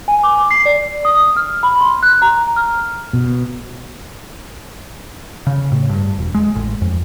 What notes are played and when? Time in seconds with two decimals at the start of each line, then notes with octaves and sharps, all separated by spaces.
0.08 G#5
0.23 D6
0.51 C7
0.65 D5
1.05 D#6
1.36 F6
1.63 B5
1.81 C6
2.03 F#6
2.22 A#5
2.56 F6
3.13 B2
5.47 C#3
5.72 A2
5.89 G2
6.18 E1
6.34 G#3
6.55 A1
6.81 F2